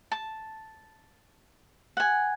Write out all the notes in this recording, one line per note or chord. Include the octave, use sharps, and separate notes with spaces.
A5
F#5 G#5